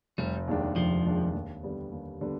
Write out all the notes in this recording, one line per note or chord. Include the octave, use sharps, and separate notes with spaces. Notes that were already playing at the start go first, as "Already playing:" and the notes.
F1 G3
D#2 D#3 G#3 D4
F1 F3
D#2 D#3 G#3 D4
D#2
D3 G3 B3
D#2
D3 G3 B3